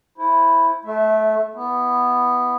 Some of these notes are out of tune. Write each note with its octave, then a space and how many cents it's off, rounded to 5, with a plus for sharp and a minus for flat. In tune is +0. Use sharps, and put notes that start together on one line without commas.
E4 +0 C5 +0
A3 -25 E5 +0
B3 +0 E4 +0